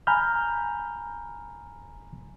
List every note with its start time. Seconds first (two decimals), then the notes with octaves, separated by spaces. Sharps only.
0.07 G#5 A#5 B5 F6 G6